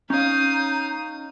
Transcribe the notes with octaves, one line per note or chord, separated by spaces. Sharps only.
C#4 D#4 C#5 F5 A#5 D#6 G6